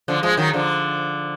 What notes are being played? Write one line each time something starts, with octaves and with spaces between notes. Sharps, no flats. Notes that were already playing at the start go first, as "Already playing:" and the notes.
D3 F3
F3 G#3
D#3 F#3
D3 F3